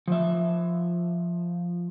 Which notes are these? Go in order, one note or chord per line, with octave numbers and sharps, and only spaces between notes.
F3 E5